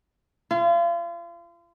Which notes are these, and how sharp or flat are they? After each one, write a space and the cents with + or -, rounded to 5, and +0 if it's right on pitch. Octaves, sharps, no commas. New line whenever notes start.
F4 -35